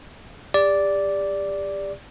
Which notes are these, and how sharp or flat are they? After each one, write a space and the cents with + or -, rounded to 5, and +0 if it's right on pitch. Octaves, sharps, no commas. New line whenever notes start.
G4 +40 D5 -5